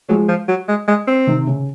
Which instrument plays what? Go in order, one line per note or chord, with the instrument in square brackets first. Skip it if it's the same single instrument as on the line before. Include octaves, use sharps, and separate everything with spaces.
[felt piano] F3 G#3 [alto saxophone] F#3
[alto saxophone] F3
F#3
G#3
G#3
C4
[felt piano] C3 D#3
C#3